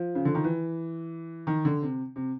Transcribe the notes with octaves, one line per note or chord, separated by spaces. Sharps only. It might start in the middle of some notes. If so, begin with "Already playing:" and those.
Already playing: F3
C#3
D3
D#3
E3
D#3
D3
C3
C3